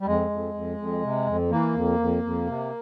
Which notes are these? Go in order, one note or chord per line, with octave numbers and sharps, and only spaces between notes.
G3
F2 G#3
F2
F2
F2
C3
F2
E3 A#3
F2
F2
F2
C3